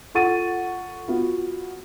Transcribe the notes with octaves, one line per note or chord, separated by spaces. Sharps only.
F4 A4 F#5 C#6 A6 D#7
B3 F4 F#4